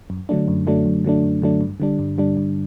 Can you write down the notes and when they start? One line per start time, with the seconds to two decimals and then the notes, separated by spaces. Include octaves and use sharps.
0.10 F#2
0.29 D3 F#3 A3 D4
0.48 F#2
0.67 D3 F#3 A3 D4
0.86 F#2
1.05 D3 F#3 A3 D4
1.23 F#2
1.42 D3 F#3 A3 D4
1.61 G2
1.80 D3 G3 D4
1.99 G2
2.18 D3 G3 D4
2.37 G2